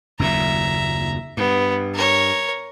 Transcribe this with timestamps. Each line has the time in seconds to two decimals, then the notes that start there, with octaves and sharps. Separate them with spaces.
0.19 F#1 D#2 A#2 E5 A#5
1.37 G2 B3
1.94 A#4 C#5